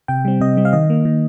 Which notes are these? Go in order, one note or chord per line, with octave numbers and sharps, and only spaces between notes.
C3 G5
G3 C4
C3 D#5
G3 C4
F5
D#3 D#5
A#3
D#3